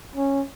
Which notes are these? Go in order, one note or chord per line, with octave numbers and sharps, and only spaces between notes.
C#4